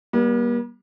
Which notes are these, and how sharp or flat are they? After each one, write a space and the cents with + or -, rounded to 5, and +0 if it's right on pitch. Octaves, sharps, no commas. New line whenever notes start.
G3 +0 A#3 +45